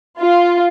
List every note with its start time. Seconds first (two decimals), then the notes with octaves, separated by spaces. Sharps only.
0.19 F4